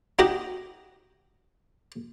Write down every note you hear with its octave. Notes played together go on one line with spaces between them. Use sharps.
D#4 F#4 G4 D#5